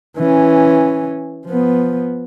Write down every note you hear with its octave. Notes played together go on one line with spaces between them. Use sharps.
E3 C#4
F3 B3